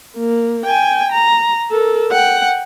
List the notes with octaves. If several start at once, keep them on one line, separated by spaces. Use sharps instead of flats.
A#3
G5 G#5
A#5
A4 A#4
F#5 G5